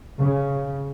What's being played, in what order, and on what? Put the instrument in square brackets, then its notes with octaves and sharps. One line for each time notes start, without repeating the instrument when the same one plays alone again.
[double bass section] C#3